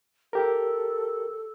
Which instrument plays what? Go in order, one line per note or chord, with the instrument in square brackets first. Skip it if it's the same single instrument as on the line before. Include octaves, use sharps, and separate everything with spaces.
[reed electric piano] G4 A#4 [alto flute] A4